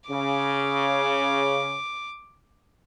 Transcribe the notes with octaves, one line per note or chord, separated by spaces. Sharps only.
C#3 D6